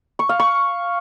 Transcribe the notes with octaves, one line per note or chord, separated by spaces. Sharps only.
C#6
F5
C#6